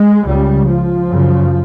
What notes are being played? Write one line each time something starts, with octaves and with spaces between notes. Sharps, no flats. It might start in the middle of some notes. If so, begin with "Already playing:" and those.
Already playing: G#3
C#2 C#3 G3
F3
F#2 C#3